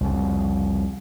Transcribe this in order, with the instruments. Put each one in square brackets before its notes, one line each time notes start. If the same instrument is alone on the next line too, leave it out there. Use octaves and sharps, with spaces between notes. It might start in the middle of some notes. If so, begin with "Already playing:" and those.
[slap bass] C2 F2 C#3